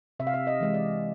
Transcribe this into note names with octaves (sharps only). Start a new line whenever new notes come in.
C3 E5
F5
E5
D#5
E3 G#3
D5